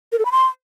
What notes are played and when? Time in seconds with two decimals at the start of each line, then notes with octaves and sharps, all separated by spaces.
0.12 A#4
0.19 A4
0.25 B5
0.32 C6